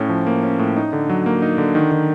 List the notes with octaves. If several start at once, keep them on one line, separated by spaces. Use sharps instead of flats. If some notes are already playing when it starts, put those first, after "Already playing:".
Already playing: A2 C#4
F3
A#3
C#4
A2
D#4
D3
F#3
A#3
D#4
D3
D#3
D#3